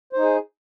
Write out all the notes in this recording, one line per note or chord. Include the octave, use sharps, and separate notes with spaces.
D#4 G#4 C5